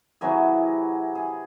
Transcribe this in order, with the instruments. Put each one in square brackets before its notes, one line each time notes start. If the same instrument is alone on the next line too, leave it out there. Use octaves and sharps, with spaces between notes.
[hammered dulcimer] C3 E3 F#3 G#4
G#4